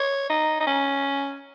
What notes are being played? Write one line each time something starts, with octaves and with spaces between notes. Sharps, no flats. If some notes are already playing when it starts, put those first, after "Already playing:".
Already playing: C#5
D#4
D#4
C#4